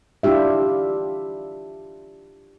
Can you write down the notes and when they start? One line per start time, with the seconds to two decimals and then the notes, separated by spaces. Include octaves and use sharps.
0.23 D4 E4 F4 G4 E5